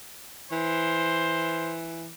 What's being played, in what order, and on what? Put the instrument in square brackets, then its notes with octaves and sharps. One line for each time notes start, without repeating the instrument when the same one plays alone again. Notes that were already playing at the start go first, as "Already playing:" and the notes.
[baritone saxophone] E3 [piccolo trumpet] C5